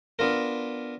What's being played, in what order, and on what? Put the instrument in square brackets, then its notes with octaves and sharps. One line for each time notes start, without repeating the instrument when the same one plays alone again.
[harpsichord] B3 D4 F4 A#4